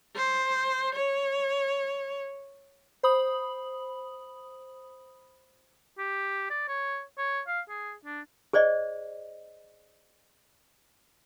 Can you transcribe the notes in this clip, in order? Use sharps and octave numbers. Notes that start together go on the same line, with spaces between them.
C5
C#5
C5 B5 D#6 F#7
G4
D5
C#5
C#5
F5
G#4
D4
G#4 C5 D5 D#5